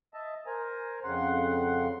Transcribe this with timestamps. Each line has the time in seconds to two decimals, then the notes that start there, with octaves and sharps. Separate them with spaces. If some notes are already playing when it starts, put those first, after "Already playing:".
0.14 D#5 E5 A5
0.46 A#4 C5 G#5 A#5
1.04 F2 C#3 F#5 C6